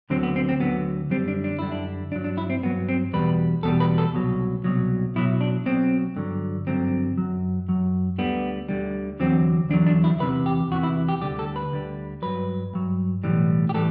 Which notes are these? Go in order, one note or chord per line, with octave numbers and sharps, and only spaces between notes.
D2 D3 F#3 C4
B3
C4
C4
D2 D3 F#3 B3
F#2 D3 G3 C4
D4
D4
F#2 D3 G3 E4
D4
G2 F#3 D4
D4
E4
C4
G2 F#3 B3
C4
E2 B2 G3 B4
E2 B2 G3 A4
B4
A4
C2 B2 F#3
C2 B2 F#3
B1 B2 F#3 E4
D4
B1 B2 F#3 C4
G2 D3 F#3
G2 D3 F#3 C4
F#2 F#3
F#2 F#3
D2 D3 G3 B3
D2 D3 G3
E2 D3 F#3 C4
E2 D3 F#3 D4
D4
E4
E2 C3 E3 B4
G4
E2 C3 E3 F#4
E4
G4
D2 D3 G3 G4
A4
B4
D2 D3 G3
G2 F#3 B4
G2 F#3
B1 A2 E3 G3
G4
A2 E3 G3 A4